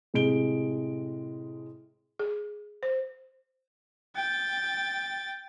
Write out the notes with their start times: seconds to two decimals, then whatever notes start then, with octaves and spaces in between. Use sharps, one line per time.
0.14 A2 C3 G#3 G#4 D7 G7
2.19 G#4
2.83 C5
4.15 G5 A6